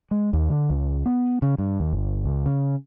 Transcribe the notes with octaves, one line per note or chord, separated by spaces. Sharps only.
G#3
D#2
D3
C#2
B3
C#3
G2
D#2
G1
C#2
C#3